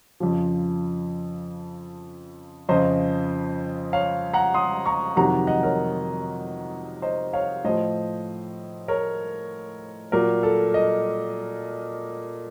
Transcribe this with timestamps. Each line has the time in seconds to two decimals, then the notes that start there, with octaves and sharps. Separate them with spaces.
0.20 F2 C#3 F3
2.69 F2 C#3 F3 C5 D#5
3.93 C#5 F5
4.34 F#5 A#5
4.54 C6 D#6
4.85 A#5 C#6
5.16 F2 C3 D#3 F#3 F#5 A#5
5.47 D#5 F#5
5.63 A#4 C#5
7.02 C5 D#5
7.33 C#5 F5
7.64 A2 F3 C5 D#5
8.88 A#4 C#5
10.12 A#2 F#3 A#4
10.43 A4
10.74 D#5